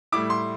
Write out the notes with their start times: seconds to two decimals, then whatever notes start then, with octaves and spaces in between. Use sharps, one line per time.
0.12 A2 G3 E4 D6
0.30 C6